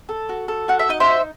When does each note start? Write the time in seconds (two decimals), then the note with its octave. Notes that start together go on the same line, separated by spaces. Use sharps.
0.09 A4
0.29 F#4
0.48 A4
0.68 F#4 F#5
0.79 E5
0.89 D#4 D#5
1.00 C5 E5
1.09 D#4